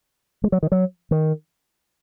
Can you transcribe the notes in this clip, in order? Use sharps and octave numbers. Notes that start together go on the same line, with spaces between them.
G#3
F#3
D#3
F#3
D#3